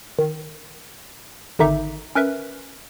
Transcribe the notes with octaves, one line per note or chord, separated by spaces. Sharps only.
D#3
G#1 D3 D#3 D#4 E5 D6
C#4 A#4 B4 E5